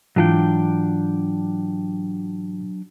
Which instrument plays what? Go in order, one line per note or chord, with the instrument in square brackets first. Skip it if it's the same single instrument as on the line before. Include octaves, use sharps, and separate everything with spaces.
[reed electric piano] G#2 E3 F4 [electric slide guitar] F#3 D4 G5